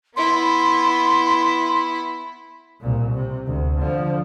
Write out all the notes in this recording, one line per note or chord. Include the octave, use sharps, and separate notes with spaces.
B3 E4 C6
C2 A#2
C3
D2
D3 F3